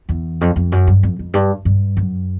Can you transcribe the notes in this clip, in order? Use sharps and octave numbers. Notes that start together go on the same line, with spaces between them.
E2
F2
F2
F#2
G2
F2
F2
G2
G2
F#2